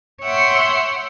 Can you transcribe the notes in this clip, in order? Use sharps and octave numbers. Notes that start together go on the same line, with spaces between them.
C#5 E5 F#5 G5 C6